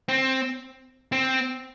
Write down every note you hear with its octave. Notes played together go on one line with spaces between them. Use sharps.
C4
C4